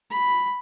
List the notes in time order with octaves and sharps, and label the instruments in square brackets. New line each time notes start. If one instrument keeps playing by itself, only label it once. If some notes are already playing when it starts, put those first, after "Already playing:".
[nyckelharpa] B5